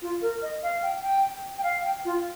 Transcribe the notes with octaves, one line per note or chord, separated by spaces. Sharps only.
F4
A#4
D#5
F5
G5
G5
G5
F5
G5
F4